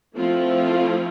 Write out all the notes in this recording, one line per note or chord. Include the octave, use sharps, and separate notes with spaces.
F3 A3 C4 E4 F4